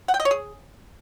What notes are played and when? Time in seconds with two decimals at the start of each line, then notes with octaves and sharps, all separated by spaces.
0.08 F#5
0.14 G5
0.20 D#5
0.25 C#5
0.31 G#4